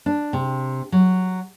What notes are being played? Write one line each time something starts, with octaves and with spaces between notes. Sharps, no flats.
D4
C3
F#3